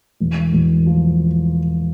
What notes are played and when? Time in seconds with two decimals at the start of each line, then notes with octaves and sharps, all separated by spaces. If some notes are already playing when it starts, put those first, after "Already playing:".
0.20 E1
0.53 E1
0.86 F3